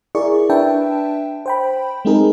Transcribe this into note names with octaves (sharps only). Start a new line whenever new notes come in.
E4 G#4 A#4 D5 C#6
D4 B4 E5 G5 A5
C5 G5 B5
G#3 A3 C4 D#4 G#4 A#4